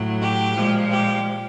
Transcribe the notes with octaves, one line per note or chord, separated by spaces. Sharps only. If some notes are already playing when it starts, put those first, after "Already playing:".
Already playing: A2 F#3
G4
A#2 F3 G#3
G4